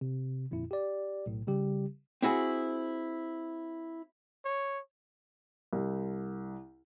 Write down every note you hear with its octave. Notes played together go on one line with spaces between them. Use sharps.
C3
G1 F2 A#2 E4
G4 D5
B1 A2
C#3 G3 G4
C4 E4 F#4 G#4
C#5
C2